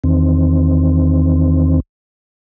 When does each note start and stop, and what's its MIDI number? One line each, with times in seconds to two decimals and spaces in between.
0.04 1.80 40
0.04 1.80 51
0.04 1.80 60